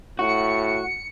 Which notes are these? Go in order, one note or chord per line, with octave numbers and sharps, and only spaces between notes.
A2 F#4 C#7